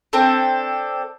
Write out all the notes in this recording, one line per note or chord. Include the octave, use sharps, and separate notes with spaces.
C4 D4 A4